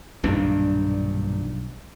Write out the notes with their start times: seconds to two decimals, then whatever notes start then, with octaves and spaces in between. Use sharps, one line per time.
0.24 B1 G2 A#2 D#3 D4